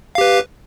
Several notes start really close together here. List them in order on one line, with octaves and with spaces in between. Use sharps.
F5 G4 B4